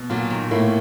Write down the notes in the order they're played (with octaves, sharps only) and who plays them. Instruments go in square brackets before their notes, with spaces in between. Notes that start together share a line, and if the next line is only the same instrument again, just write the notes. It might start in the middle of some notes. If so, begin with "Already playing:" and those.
Already playing: [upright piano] B2
[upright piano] A#2 [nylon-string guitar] F#3
[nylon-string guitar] D#3
[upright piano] A2 [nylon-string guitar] A#3